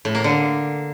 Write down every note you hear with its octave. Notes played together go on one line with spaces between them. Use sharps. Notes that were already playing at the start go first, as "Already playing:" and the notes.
A2
A#3
D3